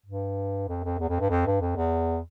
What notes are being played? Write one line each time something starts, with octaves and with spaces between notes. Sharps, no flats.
G2
F2
F2
E2
F2
G2
F2
G2
F2
E2